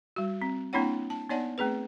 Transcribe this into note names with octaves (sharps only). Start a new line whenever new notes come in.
G3 F#4
C4
A#3 C4 D4 E4 C#5 F#5
A5
B3 D#4 C#5 D5 F#5 A5
A3 C4 G#4 B4